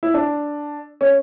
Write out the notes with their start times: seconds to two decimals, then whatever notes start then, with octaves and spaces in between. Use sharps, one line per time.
0.03 E4
0.14 D4
1.01 C#4